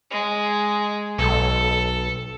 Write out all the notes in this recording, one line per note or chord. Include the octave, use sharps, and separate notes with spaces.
G#3
B1 A4